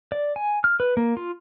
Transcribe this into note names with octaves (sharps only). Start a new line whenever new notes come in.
D5
G#5
F6
B4
A#3
F4